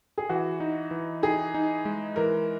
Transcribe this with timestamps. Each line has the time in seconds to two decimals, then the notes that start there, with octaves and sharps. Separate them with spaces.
0.18 G#4
0.29 E3 F#4
0.60 D#4
0.91 E3
1.23 D#4 G#4
1.54 D#4
1.85 G#3
2.16 E3 A#4